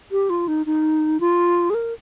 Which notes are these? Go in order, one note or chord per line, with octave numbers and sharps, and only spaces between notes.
G4
F4
D#4
D#4
F4
G#4
A#4